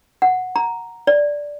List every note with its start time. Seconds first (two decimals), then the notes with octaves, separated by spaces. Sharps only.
0.22 F#5
0.56 A#5
1.07 D5